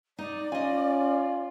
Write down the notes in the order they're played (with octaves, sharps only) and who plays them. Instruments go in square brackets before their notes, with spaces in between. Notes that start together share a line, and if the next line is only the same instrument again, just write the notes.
[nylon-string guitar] D#4 [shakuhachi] D5
[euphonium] C#4 [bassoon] F4 [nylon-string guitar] D#5 G#5